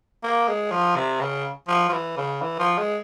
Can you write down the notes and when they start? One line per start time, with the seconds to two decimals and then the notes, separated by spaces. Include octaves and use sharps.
0.23 A#3
0.48 G#3
0.71 F3
0.96 C3
1.20 C#3
1.68 F3
1.89 F3
1.93 E3
2.17 C#3
2.42 E3
2.59 F3
2.78 G#3